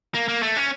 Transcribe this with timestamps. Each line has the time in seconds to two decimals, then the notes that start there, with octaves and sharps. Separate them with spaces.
0.14 A#3
0.28 A#3
0.42 A3
0.57 C#4